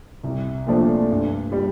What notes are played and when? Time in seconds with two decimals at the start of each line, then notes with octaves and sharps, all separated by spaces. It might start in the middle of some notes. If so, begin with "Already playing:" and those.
0.23 C2
0.67 A#2 F3 A3 D4
1.10 G2
1.52 G3